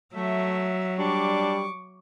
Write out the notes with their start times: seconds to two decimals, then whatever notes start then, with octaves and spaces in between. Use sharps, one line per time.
0.15 F#3 A3 E5
0.99 G3 D4 C#6 D6